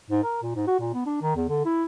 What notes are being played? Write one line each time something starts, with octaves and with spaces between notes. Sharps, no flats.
G#2
A#4
A#2
G#2
F#4
A#2
B3
D4
D#3
E2
D3
E4